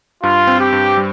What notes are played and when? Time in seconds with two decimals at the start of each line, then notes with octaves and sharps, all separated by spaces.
0.23 G2 F4
0.47 C4
0.60 G4
0.72 G2
0.97 G3